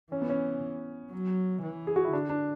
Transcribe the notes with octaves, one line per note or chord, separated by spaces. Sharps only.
E3 C#4
B3
C#4
F#3
E3
G#4
F#4
E4
D3 D4
D4